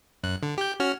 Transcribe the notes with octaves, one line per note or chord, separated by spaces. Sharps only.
F#2 F#6
D3
G4 G6
C#4 F#4 F6